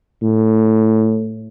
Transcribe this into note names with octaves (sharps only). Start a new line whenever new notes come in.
A2